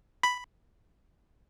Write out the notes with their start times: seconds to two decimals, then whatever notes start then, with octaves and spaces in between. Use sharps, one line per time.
0.23 B5